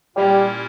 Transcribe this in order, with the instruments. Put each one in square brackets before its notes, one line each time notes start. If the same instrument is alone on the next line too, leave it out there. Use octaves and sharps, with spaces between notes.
[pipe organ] A#2 A#3 C#4 E4 A#4 [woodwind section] G3